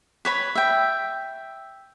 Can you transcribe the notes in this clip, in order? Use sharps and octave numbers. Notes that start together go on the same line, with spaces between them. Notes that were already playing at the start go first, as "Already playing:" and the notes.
B4 C#5 B5
E5 G5